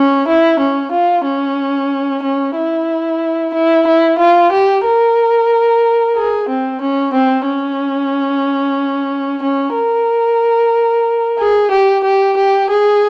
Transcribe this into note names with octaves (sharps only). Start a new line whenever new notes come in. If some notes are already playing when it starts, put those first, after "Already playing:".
Already playing: C#4
E4
C#4
F4
C#4
C#4
E4
E4
E4
F4
G4
A#4
G#4
C4
C#4
C4
C#4
C#4
A#4
G#4
G4
G4
G4
G#4